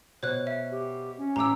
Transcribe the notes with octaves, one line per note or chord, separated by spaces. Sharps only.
B2 C5 C#5 F#6
E5
G4
C#4
A1 A#5 D6 E6